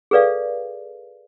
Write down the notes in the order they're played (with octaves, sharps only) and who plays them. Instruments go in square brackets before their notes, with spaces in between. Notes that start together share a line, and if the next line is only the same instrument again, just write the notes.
[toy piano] G#4 A4 B4 D5 F5